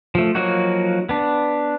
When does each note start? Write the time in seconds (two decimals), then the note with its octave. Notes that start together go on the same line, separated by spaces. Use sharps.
0.15 F3 A3
0.35 F3 F#3 A#3 D#4 F#4
1.09 B3 D4